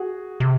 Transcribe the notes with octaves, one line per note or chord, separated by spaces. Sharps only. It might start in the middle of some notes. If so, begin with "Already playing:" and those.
Already playing: F#4 G#4
C3